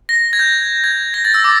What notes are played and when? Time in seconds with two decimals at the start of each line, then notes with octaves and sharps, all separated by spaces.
0.09 A#6
0.33 G#6
0.39 G6
0.84 G#6
1.14 A#6
1.25 A6
1.34 E6
1.44 D6